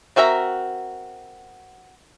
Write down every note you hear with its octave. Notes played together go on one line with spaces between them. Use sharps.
C4 F#4 A#4 E5 A#5